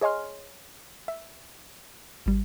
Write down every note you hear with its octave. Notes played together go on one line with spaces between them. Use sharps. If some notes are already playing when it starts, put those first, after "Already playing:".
G#4 C#5 D#5 G#5 C6 F6
E5
G#1 G3